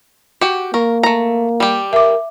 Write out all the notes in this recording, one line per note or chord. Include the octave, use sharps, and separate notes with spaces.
F#4 G4 F#5
A#3 A#4 C#6
A3 A#5
G3 G4
A#4 E5 D6